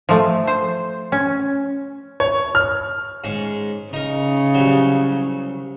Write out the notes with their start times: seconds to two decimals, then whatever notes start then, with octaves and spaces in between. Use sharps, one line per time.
0.09 F3 A3
0.47 C5
1.12 C#4
2.20 C#5
2.55 F6
3.24 G#2 C#4
3.93 C#3 D#4 A#4
4.54 C2 F#3